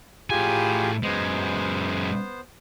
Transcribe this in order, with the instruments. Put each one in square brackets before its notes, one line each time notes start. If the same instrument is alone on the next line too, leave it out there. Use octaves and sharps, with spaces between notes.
[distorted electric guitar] A2 G#5 [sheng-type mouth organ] F4 G4 G#4
[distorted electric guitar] F#2 G#3 [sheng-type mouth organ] B3 C5